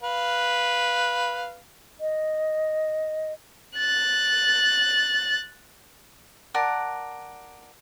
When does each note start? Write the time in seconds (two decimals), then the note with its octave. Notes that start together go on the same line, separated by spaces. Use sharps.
0.03 B4 F5
2.00 D#5
3.78 F#6 A6
6.54 A#4 D5 F#5 A5